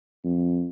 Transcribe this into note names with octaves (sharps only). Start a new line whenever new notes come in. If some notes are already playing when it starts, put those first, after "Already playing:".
F2